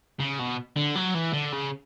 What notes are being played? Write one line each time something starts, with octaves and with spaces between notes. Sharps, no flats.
C#3
B2
D3
F#3
E3
D3
C#3